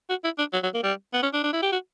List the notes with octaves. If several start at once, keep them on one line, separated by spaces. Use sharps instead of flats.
F#4
E4
D4
F#3
F#3
A#3
G3
B3
C#4
D4
D4
E4
G4
F#4